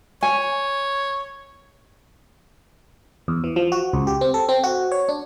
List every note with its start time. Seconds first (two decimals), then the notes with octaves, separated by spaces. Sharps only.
0.23 C#5 G#5
3.28 E2
3.44 E3
3.56 F3
3.72 F#4
3.93 C#2
4.07 G4
4.21 C4
4.34 A4
4.49 C4
4.64 F#4
4.92 C#5
5.09 D4